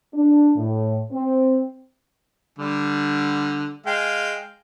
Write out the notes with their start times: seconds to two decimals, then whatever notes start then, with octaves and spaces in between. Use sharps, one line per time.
0.14 D4
0.56 A2
1.12 C4
2.59 D3 G3
3.86 G#3 F5 G5